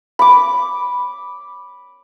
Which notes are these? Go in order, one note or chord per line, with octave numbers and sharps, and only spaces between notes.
B5 D6